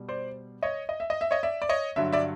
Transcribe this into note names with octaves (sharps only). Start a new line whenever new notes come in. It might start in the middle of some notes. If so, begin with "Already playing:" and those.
Already playing: B2 G3
C5 D5
C#5 D#5
D#5
E5
D#5
E5
C#5 D#5
D5 E5
D5
C#5 D#5
G2 D3 F#3 E5
D5 E5